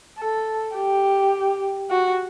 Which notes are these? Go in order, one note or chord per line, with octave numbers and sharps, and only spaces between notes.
A4
G4
F#4